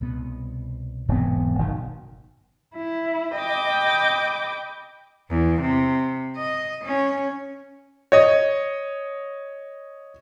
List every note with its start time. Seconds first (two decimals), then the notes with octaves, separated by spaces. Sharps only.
0.01 C2 B2 B3
1.09 E1 G#2 C3 F#3 B3
1.59 F#1 B2 D#3
2.75 E4
3.35 D#5 G5 B5 D6
5.30 E2
5.62 C3
6.36 D#5
6.84 C#4
8.12 C#5 D#5